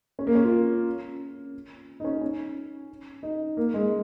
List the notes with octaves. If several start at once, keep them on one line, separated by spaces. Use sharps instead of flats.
C#4
A#3
C#4
F4
D#4
C#4
C#4
D#4
A#3
G#3